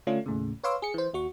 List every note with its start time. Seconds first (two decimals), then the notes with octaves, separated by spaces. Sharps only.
0.07 D3 A3 C#4 D4 F4
0.26 D#2 A2 C#3
0.64 B4 C#5 F5 C6 D6 E6
0.82 G#4 C#7
0.94 E3 C5
1.13 D#2 F#4 C#6